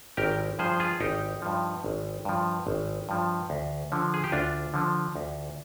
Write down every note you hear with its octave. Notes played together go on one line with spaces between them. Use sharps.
G#1 G4 A#4
G2 F3 G#4 C5
F4 G#4
G#1 D#4 G4
G2 F3
G#1
G2 F3
G#1
G2 F3
D2
D3 F3
G#4
G4
D2 D4 F4
D3 F3
D2